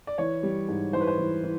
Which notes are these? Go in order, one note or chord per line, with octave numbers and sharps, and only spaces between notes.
D5
E3 C#5
G3
G#2
E3 C5
B4
C5
E3
E3